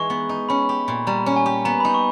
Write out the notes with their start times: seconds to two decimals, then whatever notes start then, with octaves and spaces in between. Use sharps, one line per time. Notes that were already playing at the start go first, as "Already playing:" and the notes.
Already playing: E3 G#3 D#4 C#6
0.10 B3
0.29 D#4
0.49 C#4 B5
0.69 G4
0.88 A#2
1.07 G3 A#5
1.26 C#4
1.36 G#5
1.46 G4
1.65 B3 A#5
1.80 D#4 B5
1.94 C#6